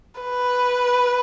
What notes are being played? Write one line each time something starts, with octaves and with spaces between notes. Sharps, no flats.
B4